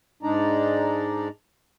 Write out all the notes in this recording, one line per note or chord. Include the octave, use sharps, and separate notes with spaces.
G#2 G#3 D4 D#4 D5 A#5